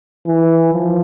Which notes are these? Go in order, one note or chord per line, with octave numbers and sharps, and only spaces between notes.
E3
F3